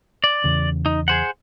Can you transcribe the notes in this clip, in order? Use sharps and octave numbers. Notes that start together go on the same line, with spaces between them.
D5
E2 C#3
D#4
G#4 C5 F#5